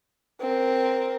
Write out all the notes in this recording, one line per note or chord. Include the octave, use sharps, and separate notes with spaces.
C4 A#4